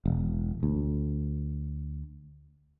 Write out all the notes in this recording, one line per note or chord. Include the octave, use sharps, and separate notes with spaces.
E1
D2